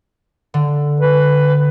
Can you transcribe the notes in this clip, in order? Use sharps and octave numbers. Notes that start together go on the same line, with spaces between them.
D3
B4